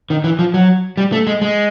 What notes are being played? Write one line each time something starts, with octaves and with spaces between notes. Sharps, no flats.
D#3
E3
F3
F#3
G3
A3
G#3
G#3